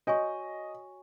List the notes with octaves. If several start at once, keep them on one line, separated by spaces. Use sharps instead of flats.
F#4 C#5 D#5 G#5 C#6